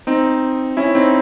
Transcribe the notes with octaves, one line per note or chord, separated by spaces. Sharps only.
C4 D#4
C#4 E4
C4 D#4